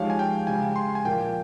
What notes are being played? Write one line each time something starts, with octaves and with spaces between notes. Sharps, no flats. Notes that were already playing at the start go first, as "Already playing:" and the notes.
Already playing: F3 G#3 D#4 G4 C#5 F5
G#5
G5
C#3 G#3 C#4 G4 G#5
C6
G#5
A#2 F3 A#3 F4 G5